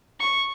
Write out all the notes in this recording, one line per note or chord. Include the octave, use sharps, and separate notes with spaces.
C#6